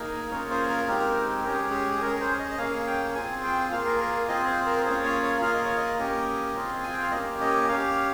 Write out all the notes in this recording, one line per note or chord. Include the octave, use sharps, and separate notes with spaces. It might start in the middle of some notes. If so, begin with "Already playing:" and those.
Already playing: A#3 D#4 G#4
A#3 C#4 F4 G#4 C#5
C5
A#4
G#3 C4 D#4 G4
G#3 C#4 G4 A#4
G#4
G#4
G#4
C#4 G#4 A#4
A#4
C5
D#5
D#5
A#3 C#4 G#4 F5
G5
C4 F4 G#4 G#5
G5
A#3 F4 G#4 F5
A#4
A#4
C4 F4 G#4 D#5
C5
A#4
A#3 C#4 F4 G#4 C5
C#5
C#5
A#3 F4 G#4 F5
D#5
C#5
D#5
A#3 C#4 G4
C4 F4 G#4
G#5
G5
F5
A#3 C#4 G4 D#5
D#5
C#4 G4 F5